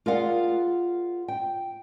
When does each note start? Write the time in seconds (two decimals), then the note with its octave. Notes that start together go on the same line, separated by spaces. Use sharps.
0.06 F4 G#4 A#4 D5 F5 F#5
1.28 G5